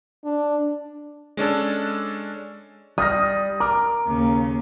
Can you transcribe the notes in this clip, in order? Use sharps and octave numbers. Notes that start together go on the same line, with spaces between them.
D4
G#3 C#4 D4 A4
G3 D#6 F6 A#6
A#4 D6
D#2 C#3